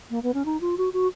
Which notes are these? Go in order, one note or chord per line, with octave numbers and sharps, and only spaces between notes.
A#3
B3
C#4
D#4
F4
F#4
F#4